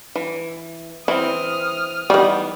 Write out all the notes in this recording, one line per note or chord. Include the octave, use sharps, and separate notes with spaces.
E3
E3 C4 E4 D#6 F6
D#3 E3 G3 B3